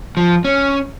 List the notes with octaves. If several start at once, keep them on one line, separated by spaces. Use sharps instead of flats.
F3
C#4